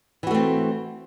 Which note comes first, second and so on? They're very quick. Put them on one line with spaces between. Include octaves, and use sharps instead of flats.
E3 F#4 A3 C4